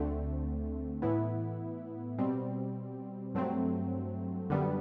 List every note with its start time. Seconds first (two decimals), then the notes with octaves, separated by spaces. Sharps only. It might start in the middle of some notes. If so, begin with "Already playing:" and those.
Already playing: D2 D3 A3 C4
1.02 A2 E3 B3 E4
2.19 B2 G3 C4
3.34 G2 F#3 A3 C4
4.50 F#2 D3 G3 B3